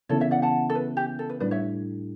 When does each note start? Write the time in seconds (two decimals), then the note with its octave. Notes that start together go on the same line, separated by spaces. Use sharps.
0.09 C#3 E3 B3 E4 A4 C#5
0.20 C#5 E5
0.31 D5 F#5
0.42 F#5 A5
0.70 A4
0.75 B4
0.97 G4
1.19 A4
1.29 B4
1.40 A2 G3 D4 B4 D5
1.51 C#5 E5